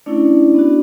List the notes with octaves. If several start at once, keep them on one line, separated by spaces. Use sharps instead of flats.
A3 C#4 D4 E4 D5
B3 D4 F#4